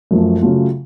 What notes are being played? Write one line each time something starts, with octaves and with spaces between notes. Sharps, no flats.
F#2 F3 A3
C#3 F#3 A3 F4